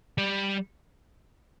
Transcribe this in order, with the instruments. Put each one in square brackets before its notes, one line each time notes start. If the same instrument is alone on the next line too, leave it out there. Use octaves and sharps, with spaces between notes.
[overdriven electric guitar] G3